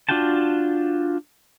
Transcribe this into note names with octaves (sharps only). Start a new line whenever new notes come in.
D4 F4 F#4 G5 A5